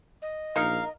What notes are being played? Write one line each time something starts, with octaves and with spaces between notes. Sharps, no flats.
D#5
A#1 A#3 D#4 A#4 F5